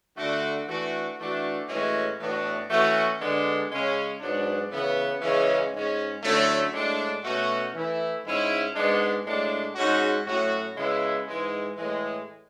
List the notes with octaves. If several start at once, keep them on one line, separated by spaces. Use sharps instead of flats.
D3 A3 D4 F#4
E3 A3 D4 F#4
E3 A3 D4 F#4
A2 E3 G#3 C#4 F#4
A2 E3 B3 D4 F#4
E3 A3 C#4 F#4
D3 G#3 B3 D4
C#3 G#3 C#4
G#2 F#3 B3 D4
C#3 E3 B3
C#3 E3 G#3 C#4
G#2 G#3 C#4
D3 F#3 A3 C#4 E4
A2 G#3 D4
B2 A3 C#4 F#4
E3 A3 E4
G#2 G#3 C#4 E4
G#2 G#3 B3 D4
A2 G#3 D4
G#2 G#3 C#4 F#4
A2 F#3 C#4 F#4
C#3 G#3 B3 E4
G#2 E3 G#3
A2 E3 G#3